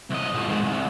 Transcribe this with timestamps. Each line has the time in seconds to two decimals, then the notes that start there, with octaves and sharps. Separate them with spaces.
0.10 C2 D#5
0.34 A2 F3
0.48 G#2 D#3
0.64 C2